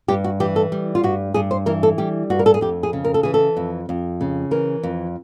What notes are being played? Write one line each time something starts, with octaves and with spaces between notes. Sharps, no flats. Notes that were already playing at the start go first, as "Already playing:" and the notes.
G2 G4
F#4
E3 G4
A4
G3
F4
G2 F#4
G2 G#4
C5
E3 A#4
A4
G3 G4
G2 F#4
A#4
A4
G#4
F2 G4
G#4
C#3
A#4
A4
E3 G#4
A4
F2
F2
C#3
E3 A#4
F2